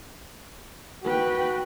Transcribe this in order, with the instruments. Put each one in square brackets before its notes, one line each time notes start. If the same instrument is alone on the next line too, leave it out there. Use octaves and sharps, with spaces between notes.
[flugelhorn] F#4 [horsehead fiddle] B4 G5